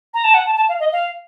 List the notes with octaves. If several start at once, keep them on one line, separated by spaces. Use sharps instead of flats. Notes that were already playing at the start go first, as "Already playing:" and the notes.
A#5
A5
F#5
A5
A5
F5
D#5
F5